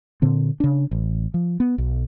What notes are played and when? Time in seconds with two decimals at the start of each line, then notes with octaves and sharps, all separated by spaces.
0.22 A#2 D3 C4
0.60 C#3 D4
0.91 A1
1.34 F3
1.60 B3
1.78 B1